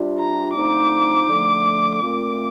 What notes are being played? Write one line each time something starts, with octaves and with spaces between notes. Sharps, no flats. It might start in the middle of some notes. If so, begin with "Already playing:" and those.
Already playing: C3 G3 D4 F4
A#5
D3 F3 A3 C4 D#4 D6
D3 F3 A3
A#2 A3 C4 F4 D6